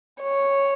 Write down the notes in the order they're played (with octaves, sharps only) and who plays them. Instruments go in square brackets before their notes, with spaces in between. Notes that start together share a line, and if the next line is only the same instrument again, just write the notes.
[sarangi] C#5